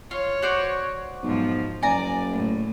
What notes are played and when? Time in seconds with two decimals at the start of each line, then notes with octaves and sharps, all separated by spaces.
0.11 F4 C#5
0.42 F#4 C5 D5
1.23 B1 G#2 F3
1.83 F#1 D5 G#5 A#5
2.32 A2